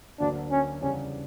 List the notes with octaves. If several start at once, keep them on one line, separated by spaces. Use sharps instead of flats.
D2 D3 F#3 A#3 D4
C#4
E2 C#3 G3 B3 C#4 D4